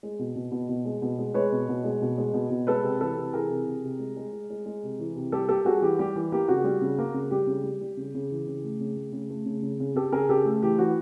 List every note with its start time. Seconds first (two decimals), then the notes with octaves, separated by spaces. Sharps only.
0.03 G#3
0.19 B2
0.36 B2
0.51 B2
0.69 B2
0.85 G#3
1.02 B2
1.18 G#3
1.34 G#3 B4 C#5
1.52 B2
1.69 B2
1.84 G#3
2.02 B2
2.18 G#3
2.34 B2
2.50 B2
2.67 G#3 A4 B4
2.84 C3
3.00 E3 A4 B4
3.17 C3
3.33 E3 G#4 A#4
3.50 C3
3.66 C3
3.84 C3
3.99 G#3
4.16 G#3
4.33 G#3
4.50 G#3
4.66 G#3
4.83 C3
4.99 E3
5.16 C3
5.32 G3 G4 A4
5.49 A#3 G4 A4
5.65 G3 F#4 G#4
5.82 E3 G4
5.99 G3 G4
6.16 E3
6.32 A#3 G4
6.48 C#3 F#4
6.64 G3
6.81 C#3
6.98 A#3
7.14 C#3
7.31 G3 G4
7.47 C#3
7.63 G3
7.81 G3
7.97 C#3
8.14 C#3
8.31 E3
8.47 C#3
8.64 A3
8.80 C#3
8.97 A3
9.13 C#3
9.30 A3
9.46 C#3
9.62 C#3
9.80 C#3
9.95 C#3 G4 A4
10.12 C#3 G#4 A#4
10.29 C#3 G4 A4
10.45 A3
10.62 E3 G4
10.79 E3 F#4